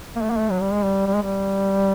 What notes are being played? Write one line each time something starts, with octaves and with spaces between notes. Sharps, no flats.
A#3
A3
A#3
A3
F#3
G3
G#3
G3
G3
G#3
G3